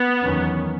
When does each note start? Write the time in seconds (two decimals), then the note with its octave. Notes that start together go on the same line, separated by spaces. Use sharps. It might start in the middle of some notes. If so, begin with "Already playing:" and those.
Already playing: B3
0.24 E2 D#3 F#3 C#4